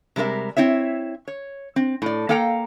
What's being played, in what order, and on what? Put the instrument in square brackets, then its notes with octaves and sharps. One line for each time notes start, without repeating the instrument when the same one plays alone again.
[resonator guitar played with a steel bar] C3 G3 G#3 A#4 E5
C4 E4 C#5 E5
C#5
C4
A2 D5
A#3 A4 F5 G5 G#5 A#5